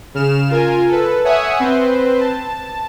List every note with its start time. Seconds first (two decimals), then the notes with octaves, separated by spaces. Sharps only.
0.14 C#3 F6 E7
0.49 F4 A#4 G#5
0.88 A4 B4
1.25 C#5 E5 F#5 G#5 D#6
1.60 C4 B4 C5
2.21 A5